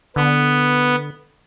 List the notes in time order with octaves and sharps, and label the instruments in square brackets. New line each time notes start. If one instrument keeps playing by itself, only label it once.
[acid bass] D3 [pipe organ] B3